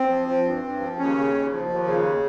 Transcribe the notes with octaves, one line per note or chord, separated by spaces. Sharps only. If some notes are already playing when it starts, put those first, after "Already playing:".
Already playing: C4
F3
F3
G2
G2
F3
D#2 C#3 C#4
C#3
D#2
F3
D#2
C#3